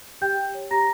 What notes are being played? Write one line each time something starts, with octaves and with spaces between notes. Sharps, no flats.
G4 G5 G6
G4
C#5
G4 A#5 A#6